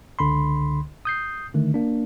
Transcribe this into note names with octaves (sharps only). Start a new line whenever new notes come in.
C#2 D3 B5 C6
D#6 G6 C7
D3 D#3 A3
A#3 D4